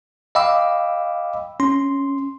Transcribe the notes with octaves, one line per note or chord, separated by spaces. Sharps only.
D#5 F5 G5 B5 D6 E6
C#4 C6